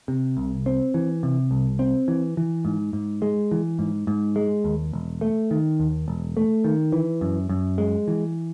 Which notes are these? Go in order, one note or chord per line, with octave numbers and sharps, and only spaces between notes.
C3
C2
C4
E3
C3
C2
C4
E3
E3
G#2
G#2
G#3
E3
G#2
G#2
G#3
D#2
E1
A3
D#3
D#2
E1
A3
D#3
E3
F#2
F#2
G#3
E3